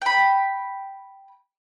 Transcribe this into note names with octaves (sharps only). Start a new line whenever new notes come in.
G5 B5